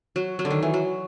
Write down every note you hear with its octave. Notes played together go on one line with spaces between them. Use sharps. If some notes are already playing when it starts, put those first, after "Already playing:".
F#3
F#3
D3
D#3
E3
F#3